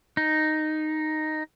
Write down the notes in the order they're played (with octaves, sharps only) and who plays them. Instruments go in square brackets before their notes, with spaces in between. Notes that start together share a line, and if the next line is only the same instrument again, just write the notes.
[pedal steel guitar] D#4